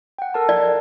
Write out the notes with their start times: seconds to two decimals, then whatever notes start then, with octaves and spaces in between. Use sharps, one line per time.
0.18 F#5 G5
0.34 A4 A#4 A5
0.49 D5